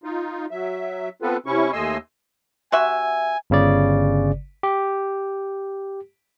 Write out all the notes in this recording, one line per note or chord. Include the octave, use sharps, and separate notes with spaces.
D#4 F4
F#3 E5
B3 C4 F4 A4 B4
C3 C#4 E4 C#6
D#2 A3 D#5 G#5 C6 E6
C3 F#4 E5 G#5
G1 C#3 D5
G4